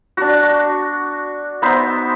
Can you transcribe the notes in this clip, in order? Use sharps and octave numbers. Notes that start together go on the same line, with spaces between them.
D4 F#4
B3 D#4 C5 E5